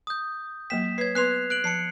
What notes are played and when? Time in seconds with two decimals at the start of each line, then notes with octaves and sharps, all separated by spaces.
0.07 D#6 G6
0.70 F#3 A#3 G5 B6 E7
0.98 B4 C#5 G#6 C7
1.15 B3 B4 C6 F#6 C7 F7
1.50 F#6 D7 F#7
1.64 F3 A5 C7 C#7